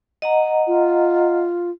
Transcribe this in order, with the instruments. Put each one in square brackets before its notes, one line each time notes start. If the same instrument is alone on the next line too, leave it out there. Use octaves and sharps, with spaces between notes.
[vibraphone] D#5 F#5 A#5
[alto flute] F4